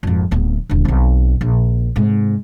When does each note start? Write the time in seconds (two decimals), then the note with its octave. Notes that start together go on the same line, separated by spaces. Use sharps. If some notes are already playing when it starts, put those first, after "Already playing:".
0.03 G#1 F2
0.31 D1 B3
0.70 D#1 D3
0.85 B1 C4
1.41 A#1
1.96 G#2 C3